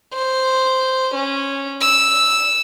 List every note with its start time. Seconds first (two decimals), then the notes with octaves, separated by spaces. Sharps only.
0.14 C5
1.14 C#4
1.81 E6